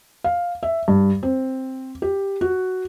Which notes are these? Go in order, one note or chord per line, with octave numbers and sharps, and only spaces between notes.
F5
E5
G2
C4
G4
F#4